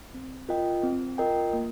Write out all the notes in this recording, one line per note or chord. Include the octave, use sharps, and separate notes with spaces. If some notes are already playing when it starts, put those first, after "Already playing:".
C4
F4 A#4 D#5 G5
C4
F4 A#4 D#5 G5
A#3